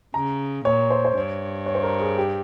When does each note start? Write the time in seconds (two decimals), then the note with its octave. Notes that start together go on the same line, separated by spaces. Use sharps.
0.14 C#3 A#5
0.65 A#2 C#5
0.90 C5
1.05 C5
1.15 G2 C#5
1.66 C#5
1.75 C5
1.83 A#4
2.00 G#4
2.17 G4